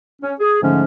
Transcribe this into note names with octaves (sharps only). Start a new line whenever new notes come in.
C#4
G#4
G#2 D3 F3 A3 C#4